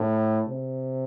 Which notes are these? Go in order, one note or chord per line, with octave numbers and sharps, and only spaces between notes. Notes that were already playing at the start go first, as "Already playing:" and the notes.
Already playing: A2
C3